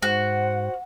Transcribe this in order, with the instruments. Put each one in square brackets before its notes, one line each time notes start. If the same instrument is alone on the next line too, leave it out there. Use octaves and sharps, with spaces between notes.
[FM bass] G#2 [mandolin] F#4 [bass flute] C5 [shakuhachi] F#5